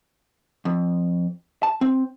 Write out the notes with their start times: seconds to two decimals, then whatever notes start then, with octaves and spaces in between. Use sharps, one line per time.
0.65 F2
1.63 A5
1.81 C4